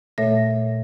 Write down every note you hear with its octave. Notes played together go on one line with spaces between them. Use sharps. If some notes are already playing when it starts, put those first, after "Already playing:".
A#2 A3 A4 C#5 E5 A#6